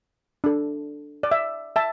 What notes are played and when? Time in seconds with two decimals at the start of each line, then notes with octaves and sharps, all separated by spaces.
0.44 D4 A4
1.23 D5
1.31 E5
1.76 E5 A5